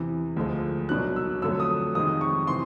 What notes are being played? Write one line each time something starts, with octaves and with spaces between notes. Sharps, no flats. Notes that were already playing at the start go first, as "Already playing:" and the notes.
Already playing: E2 C3 E3
D2 D3 F3 G#3
C2 B2 F#3 F#6
E6
F2 D3 F#3 A3 E6
D#6
F2 C3 D#3 G#3 D#6
C#6
C3 E3 C6